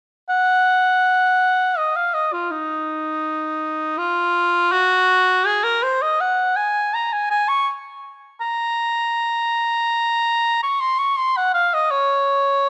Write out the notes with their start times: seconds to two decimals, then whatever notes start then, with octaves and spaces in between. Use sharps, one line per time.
0.30 F#5
1.78 D#5
1.96 F5
2.14 D#5
2.33 F4
2.51 D#4
3.98 F4
4.72 F#4
5.46 G#4
5.64 A#4
5.83 C5
6.02 D#5
6.21 F#5
6.57 G#5
6.94 A#5
7.13 G#5
7.31 G#5
7.49 C#6
8.41 A#5
10.63 C#6
10.81 C6
10.99 C#6
11.18 C6
11.37 F#5
11.54 F5
11.74 D#5
11.91 C#5